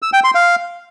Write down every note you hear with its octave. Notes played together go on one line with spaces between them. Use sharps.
E6
G5
C6
F5